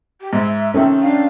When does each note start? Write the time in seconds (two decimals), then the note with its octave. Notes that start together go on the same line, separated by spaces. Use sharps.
0.21 G4
0.33 G#2 E5
0.74 C3 D#3 A3 C#4
1.02 D4 F5